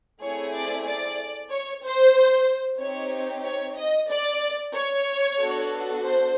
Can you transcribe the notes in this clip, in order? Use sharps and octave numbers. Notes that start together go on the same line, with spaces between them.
A3 C4 E4 G#4 C#5
D5
D5
C#5
C5
C4 D#4 G4 C#5
C#5
D#5
D5
C#5
B3 D4 F#4 A4
C5